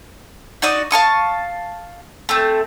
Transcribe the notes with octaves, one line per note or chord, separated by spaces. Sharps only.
D#4 F#4 D5 D#6
F5 A5 C#6 D#6
A3 C4